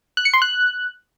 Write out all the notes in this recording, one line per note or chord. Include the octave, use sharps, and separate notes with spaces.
F#6
C#7
C6
F#6